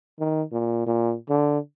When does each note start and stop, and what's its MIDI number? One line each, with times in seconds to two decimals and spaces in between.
0.20 0.43 51
0.52 0.82 46
0.87 1.15 46
1.30 1.58 50